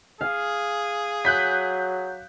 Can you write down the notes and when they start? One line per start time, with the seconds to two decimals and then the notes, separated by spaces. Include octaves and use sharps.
0.21 G#4 F5
1.25 F#3 F#6 G6 B6